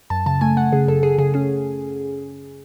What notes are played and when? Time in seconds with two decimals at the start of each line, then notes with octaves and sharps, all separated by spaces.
0.10 F#2 A5
0.26 C#3 A5
0.41 A3 G#5
0.57 A3 F#5
0.72 C#3 G#4
0.87 F#2 A4
1.03 F#2 G#4
1.18 C#3 G#4
1.34 C#4 G#4